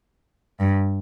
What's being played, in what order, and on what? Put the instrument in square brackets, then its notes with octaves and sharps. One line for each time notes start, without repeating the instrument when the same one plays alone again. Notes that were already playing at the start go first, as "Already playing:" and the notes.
[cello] G2